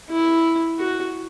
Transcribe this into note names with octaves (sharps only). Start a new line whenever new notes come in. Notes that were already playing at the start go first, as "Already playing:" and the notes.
E4
F#4